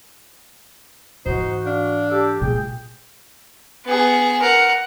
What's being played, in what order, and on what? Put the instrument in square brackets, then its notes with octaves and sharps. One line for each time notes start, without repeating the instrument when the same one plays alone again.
[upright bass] G#2 E3 [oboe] D#4 [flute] F#4 [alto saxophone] C5
[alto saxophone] D4 [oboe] F5
[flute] G4 [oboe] A4
[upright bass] A#2 G#3 [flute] G#4 [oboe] G5
[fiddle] B3 G#4
A#4 F#5